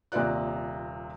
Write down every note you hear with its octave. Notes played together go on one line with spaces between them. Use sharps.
D#1 C3 A#3 F4 D5 F#6